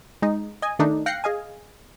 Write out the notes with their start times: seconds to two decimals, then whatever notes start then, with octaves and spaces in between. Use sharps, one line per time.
0.22 G#3 D#4
0.62 D#5 G#5
0.79 D#3 A3 D4 D#4
1.06 F5 G5 F#6 A#6 C7 C#7
1.24 G#4 D#5 F5 G#5